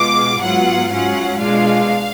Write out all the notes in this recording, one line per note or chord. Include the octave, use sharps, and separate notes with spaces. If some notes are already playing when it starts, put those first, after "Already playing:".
Already playing: B2 G#3 B3 F4 D6
G#2 F#3 B3 F4 F#5
G#2 F#3 C#4 F4 F#5
B2 G#3 D4 F4 F5